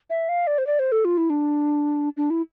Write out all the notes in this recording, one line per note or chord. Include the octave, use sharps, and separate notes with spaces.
E5
F5
D5
C5
D5
C5
A4
F4
E4
D4
D4
E4